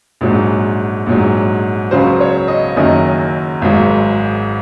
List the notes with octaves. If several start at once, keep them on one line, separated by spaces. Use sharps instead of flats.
A#1 G#2 F#3
A#1 G#2 F#3
C#2 C#3 F#3 C5
C#5
D#5
F#1 F#2 D#3 F#3 D#5
G#1 G#2 F#3